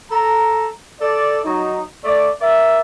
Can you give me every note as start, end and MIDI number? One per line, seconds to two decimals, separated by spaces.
0.11 0.68 69
0.11 0.68 82
1.01 1.40 69
1.01 1.40 74
1.45 1.82 54
1.45 1.82 63
2.04 2.30 57
2.04 2.30 74
2.41 2.81 70
2.41 2.81 74
2.41 2.81 76